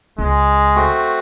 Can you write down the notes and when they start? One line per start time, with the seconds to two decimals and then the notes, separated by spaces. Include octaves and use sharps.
0.18 C#2 G#3
0.76 A3 C4 F#4